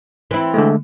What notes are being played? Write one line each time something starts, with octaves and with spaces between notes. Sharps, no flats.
E3 C4 E4
D3 G#3 A3